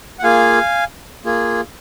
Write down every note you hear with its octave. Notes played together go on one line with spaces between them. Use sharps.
F#5
A#3 F4 G#4 F5 G#5
A#3 F4 G#4